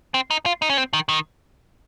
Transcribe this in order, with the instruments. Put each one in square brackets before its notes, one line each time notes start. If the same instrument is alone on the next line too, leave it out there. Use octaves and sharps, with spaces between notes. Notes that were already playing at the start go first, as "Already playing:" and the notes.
[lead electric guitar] C4
D#4
F4
D#4
C#4
C4
D#3
D#3